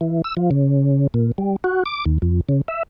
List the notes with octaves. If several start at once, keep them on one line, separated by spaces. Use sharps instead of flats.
E3
E6
F3
C#3
A#2
G3
F#4
D6
D#2
F2
C#3
E5